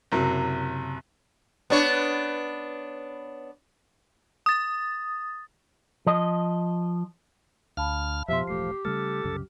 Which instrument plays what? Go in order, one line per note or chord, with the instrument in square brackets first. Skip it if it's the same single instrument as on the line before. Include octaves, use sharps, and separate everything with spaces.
[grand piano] F#1 C3 F#3
[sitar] B3 D4 C#5
[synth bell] D#6 A6
[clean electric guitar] F3 D#5
[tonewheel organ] D2 F6 [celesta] F5 A5 B5
[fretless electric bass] F2 B2 [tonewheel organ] F3 [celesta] G4 C6 [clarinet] E5
[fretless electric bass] E1 A1 A3 [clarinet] G4 [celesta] C7
[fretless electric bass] C#3 G3 A3 [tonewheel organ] A4 [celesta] F6
[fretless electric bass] C2 F#2 C#3